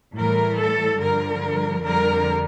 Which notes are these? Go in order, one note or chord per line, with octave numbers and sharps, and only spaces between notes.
A2 E3 G3 A#4
A4
G2 D3 F3 A#4
F2 D3 G3 A#4